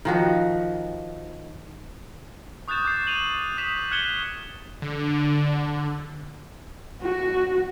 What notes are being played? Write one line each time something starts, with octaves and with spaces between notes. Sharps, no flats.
D#3 F3 F#4
C#6 D#6 F#6 G6 A6 E7
D6 G6 A6 C7 E7
D#7 F7 F#7
D#6 B6 E7
F6 F#6 G#6 C#7 E7 G7
D3
F#4